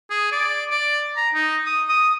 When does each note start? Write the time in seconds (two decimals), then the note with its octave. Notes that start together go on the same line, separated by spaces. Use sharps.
0.11 G#4
0.32 D5
0.71 D5
1.17 A#5
1.34 D#4
1.66 D#6
1.89 D#6